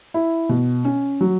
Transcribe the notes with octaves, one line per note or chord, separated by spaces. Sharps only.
E4
B2
C#4
F#3